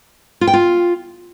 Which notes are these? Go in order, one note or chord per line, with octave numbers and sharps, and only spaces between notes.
F4
G5
F4